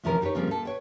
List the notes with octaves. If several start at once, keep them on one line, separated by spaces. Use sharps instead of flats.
D2 C3 E3 F3 C#4 A#4
D#4 G4 A#4 B4 C#5
C#3 F3 G3 A#3 C4
A#2 A4
B4 C#5 G5